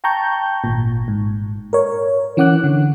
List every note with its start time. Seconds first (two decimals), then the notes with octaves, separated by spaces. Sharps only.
0.04 G5 A5 A#5 C#6 G6
0.64 G#1 A#2
1.08 G#2
1.73 A#4 C#5
2.37 E3 C#4 F#5 D6 F#6
2.64 D3